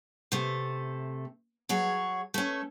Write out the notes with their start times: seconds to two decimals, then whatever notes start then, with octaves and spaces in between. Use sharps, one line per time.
0.32 C3 A3
1.69 F#3 G#4 C#5
2.34 A3 C#4